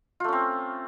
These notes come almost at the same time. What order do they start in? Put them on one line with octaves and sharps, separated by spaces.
F4 A3 C#4 C4